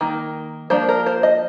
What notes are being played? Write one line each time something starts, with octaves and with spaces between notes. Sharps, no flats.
D#3 A#3
F3 A#3 D4 C5
A#4
C5
D#5